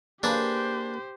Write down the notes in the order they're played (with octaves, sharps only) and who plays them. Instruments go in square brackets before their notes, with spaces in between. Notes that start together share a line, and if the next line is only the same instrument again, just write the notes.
[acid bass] A#3 [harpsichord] D4 G#4 B4 [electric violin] G4 C5